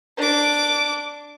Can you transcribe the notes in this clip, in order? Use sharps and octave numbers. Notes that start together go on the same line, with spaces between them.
D4 D6